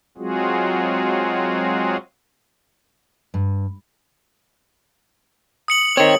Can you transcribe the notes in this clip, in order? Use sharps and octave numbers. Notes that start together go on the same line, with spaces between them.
F#3 G#3 C4 F4 F#4 G#4
G2
D#6 C#7 F#7
D#3 C4 C#5